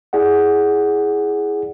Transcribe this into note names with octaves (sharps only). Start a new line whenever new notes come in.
E4 G#4 D5 F#5